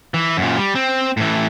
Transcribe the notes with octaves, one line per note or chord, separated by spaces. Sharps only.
E3
F#2 A#2
G3
C4
A2 E3